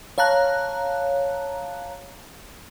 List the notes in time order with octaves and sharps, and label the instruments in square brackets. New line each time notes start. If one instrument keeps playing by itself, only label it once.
[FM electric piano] C#5 F5 A5 A#5 F#6